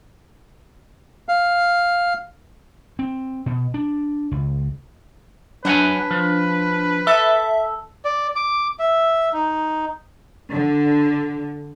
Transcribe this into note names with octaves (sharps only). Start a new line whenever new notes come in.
F5
C4
B2
D4
C#2
F#3 D4 B4 F#5 G#5
F3
A4 E5
D5
D6
E5
D#4
D3